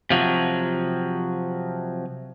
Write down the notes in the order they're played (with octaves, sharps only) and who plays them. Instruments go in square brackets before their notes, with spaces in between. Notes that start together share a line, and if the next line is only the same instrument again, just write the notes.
[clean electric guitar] C3 F3 F#3